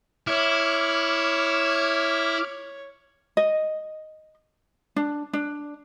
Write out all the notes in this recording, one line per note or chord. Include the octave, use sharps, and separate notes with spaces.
E4 C#5 D6 F6
D#5
D4
D4